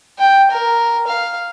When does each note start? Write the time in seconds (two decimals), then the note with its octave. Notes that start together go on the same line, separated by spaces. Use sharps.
0.19 G5
0.51 A#4
1.07 F5